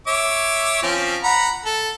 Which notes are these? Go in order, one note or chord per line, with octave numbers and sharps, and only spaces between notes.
C#5 E5 D6
F3 C4 C#4
F#5 A#5 B5
A4